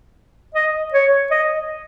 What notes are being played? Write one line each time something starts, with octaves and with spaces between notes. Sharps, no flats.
D#5
C#5
D#5